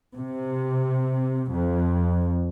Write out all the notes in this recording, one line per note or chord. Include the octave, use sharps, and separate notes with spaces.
C3
F2